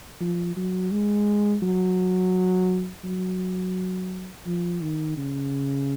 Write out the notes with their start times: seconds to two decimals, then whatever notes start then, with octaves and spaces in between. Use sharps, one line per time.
0.21 F3
0.56 F#3
0.92 G#3
1.62 F#3
3.04 F#3
4.46 F3
4.81 D#3
5.17 C#3